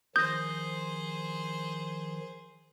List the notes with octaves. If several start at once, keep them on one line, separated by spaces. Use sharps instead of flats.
D#3 F3 G#4 C5 D#6 G6 A#6